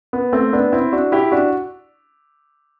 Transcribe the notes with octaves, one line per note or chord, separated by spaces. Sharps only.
B3
A3 C4
B3 D4
C4 E4
D4 F#4
E4 G4
D4 F#4